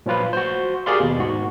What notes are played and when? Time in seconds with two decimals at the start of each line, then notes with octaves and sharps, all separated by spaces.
0.06 A#2 F3 F#3 F4 B4
0.33 F#4 C5
0.86 G4 G#4 A#4 D5 F5 C6
1.00 D#2 B2
1.19 G#2 F#4